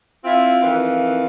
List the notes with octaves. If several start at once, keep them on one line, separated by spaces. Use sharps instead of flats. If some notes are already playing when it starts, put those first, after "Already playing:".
C4 E4 F4
F2 D#3 E3 F5